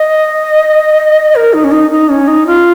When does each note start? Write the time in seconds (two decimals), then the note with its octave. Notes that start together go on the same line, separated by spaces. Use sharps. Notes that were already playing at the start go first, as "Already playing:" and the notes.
Already playing: D#5
1.35 A#4
1.53 D#4
1.64 C#4
1.72 D#4
1.91 D#4
2.09 C#4
2.28 D#4
2.47 F4